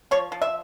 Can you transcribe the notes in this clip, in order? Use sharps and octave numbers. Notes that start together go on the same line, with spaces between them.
F3 C#5
F3
E5